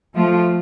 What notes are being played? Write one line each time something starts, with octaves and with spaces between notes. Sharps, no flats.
F3 A3 F4